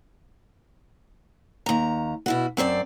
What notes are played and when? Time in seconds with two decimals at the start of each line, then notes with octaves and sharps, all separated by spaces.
1.66 D#2 A#5
2.26 B2 E4 F#4
2.57 F#2 C4 G#4 D5